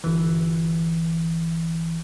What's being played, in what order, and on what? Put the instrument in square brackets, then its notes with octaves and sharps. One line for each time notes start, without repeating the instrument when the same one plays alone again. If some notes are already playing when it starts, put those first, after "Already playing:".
[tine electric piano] G1 E3